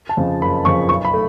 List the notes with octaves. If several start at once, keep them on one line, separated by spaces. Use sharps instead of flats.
A5
F2 C#3 F3
F#1 B5
F2 C#3 F3 C#6
B1 C#6
B5
A3